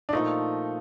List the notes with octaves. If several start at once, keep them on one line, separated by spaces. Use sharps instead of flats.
D4
A#2 F3 A3 D#4